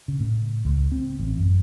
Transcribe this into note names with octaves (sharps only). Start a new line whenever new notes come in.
C#3
A2
C#2
C4
A1
F#2